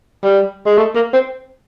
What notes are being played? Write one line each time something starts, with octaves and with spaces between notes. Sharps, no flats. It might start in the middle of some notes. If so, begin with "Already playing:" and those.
G3
G#3
A3
A#3
C4